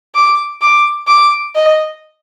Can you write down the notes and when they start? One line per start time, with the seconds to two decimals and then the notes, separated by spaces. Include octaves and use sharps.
0.15 D6
0.62 D6
1.07 D6
1.55 D#5